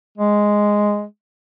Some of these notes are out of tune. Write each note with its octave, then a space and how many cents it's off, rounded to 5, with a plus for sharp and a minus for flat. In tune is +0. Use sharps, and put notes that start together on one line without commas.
G#3 +0